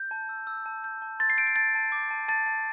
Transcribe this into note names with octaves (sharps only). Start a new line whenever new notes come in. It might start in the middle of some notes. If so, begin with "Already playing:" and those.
Already playing: G6
A5
E6
E6
A5
G6
A5
C6 A6
C7
G6 D7
C7
A5 A6
A5
D6
A5
A5 A6
A5